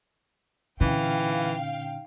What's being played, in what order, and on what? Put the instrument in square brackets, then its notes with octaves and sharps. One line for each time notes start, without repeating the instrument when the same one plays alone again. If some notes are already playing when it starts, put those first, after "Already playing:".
[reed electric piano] A#2 D3 C#4 [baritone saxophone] E3 [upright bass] D#4 [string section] F5 G5